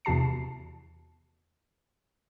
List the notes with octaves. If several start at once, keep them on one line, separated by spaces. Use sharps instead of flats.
E2 C3 F#4 A5 C7